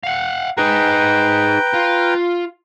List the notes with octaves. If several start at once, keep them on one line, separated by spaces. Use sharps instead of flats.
F5 F#5
D#4 G#4 B4 G5 A#5
F4